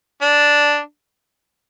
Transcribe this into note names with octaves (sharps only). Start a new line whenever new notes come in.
D4